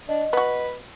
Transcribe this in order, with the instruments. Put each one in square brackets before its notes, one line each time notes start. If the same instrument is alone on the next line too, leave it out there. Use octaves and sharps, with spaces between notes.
[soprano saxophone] D4 [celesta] D#5
[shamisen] B3 F#4 [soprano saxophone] B4